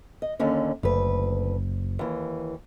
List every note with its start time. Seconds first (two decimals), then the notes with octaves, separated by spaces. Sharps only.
0.22 D#5
0.39 D#2 D3 C#4
0.83 F#1 D2 B4
1.99 D#2 E3